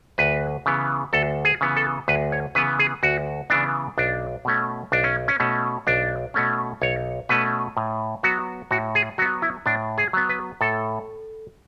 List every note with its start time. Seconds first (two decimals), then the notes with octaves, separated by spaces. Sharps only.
0.18 D2 B4
0.66 C#3 E3 B3
1.13 D2 A4
1.45 G#4
1.61 C#3 E3 B3
1.77 A4
2.08 D2 B4
2.32 C#5
2.55 C#3 E3 B3 B4
2.79 G#4
3.03 D2 F#4
3.50 C#3 E3 B3 D4
3.98 B1 D4
4.45 B2 A3 C#4
4.92 B1 D4
5.04 C#4
5.28 C#4
5.40 B2 A3 C#4
5.87 B1 D4
6.34 B2 A3 C#4
6.82 B1 C#5
7.29 B2 A3 C#4 B4
7.77 A2
8.23 F#3 B3 F#4
8.71 A2 F#4
8.95 G#4
9.18 F#3 B3 F#4
9.42 E4
9.66 A2 D4
9.98 G#4
10.13 F#3 B3
10.29 B4
10.61 A2 A4